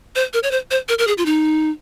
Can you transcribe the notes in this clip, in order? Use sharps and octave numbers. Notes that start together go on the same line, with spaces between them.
C5
A#4
C#5
C5
C5
A#4
A#4
G#4
F4
D#4